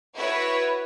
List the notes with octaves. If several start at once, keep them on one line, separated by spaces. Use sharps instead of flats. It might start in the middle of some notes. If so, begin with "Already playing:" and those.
E4 F#4 B4 C#5